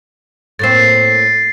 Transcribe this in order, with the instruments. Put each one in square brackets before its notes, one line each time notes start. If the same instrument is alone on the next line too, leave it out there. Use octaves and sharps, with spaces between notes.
[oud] A2 A#3 C4 [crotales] A6 C7